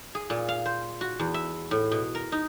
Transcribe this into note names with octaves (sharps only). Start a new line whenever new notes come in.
G#4
A#2
F5
C5
F#4
E2
E5
A2
B2
A#4
D#4